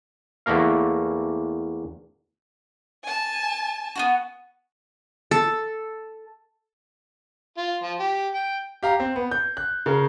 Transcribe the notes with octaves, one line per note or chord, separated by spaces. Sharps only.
E2 A3 A#3 A#4 F5
G#5 A5
B3 D4 F#4
A4
F4
F3
G4
G5
G4 F5 A#5
C4
B3
G6
F#6
C#3 A#4